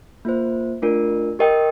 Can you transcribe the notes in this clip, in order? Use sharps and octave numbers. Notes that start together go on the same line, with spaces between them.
A#3 F4 C5
A3 D4 F4 A#4
G4 A#4 D#5 G5